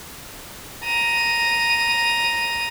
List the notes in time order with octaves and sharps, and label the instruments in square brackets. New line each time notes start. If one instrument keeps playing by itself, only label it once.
[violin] A#5 D#7